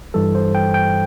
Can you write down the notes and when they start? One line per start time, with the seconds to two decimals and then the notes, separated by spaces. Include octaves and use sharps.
0.14 G2 E3 G3 A4
0.35 C5
0.55 G5
0.74 G5